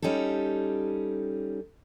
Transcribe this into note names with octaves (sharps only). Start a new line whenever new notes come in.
G3 C#4 D#4 G4 A4